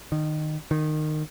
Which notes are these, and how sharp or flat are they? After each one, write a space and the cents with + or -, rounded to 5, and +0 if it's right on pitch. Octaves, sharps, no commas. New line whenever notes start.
D#3 -20
D#3 -20